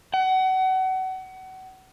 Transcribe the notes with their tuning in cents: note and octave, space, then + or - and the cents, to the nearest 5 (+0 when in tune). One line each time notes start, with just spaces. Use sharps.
F#5 +30